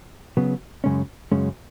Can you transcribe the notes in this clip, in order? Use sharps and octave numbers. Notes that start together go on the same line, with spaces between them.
C#3 F#3 B3
F#2 C#3 G#3 C#4
F#2 C#3 G#3 C#4